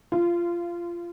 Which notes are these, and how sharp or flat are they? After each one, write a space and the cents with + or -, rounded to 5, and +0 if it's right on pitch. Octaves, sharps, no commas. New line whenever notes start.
F4 -20